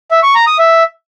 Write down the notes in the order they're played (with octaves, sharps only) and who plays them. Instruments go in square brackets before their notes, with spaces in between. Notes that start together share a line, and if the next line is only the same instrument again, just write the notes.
[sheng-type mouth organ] E5
C#6
A#5
D#6
E5